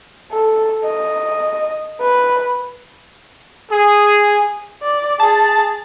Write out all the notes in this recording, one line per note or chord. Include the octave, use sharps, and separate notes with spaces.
A4
D#5
B4
G#4
D5
G#4 A5